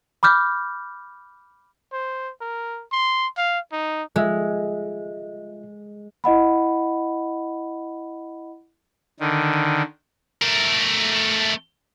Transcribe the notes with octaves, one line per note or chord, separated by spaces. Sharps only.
B5 D6 F6 G6
C5
A#4
C6
F5
D#4
G#3 F4 E5
E4 D#5 F#5 B5
D3 D#3
A3 A#4